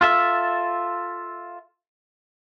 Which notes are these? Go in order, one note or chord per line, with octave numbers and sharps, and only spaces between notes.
F4 A4 E5